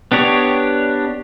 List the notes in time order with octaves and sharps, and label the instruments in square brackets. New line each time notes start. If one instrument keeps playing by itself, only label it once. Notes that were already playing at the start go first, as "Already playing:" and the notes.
[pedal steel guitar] B3 D4 G4 C#5